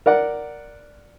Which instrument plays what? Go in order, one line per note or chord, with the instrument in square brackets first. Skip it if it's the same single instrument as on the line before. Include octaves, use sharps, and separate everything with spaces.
[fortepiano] A#4 D5 F#5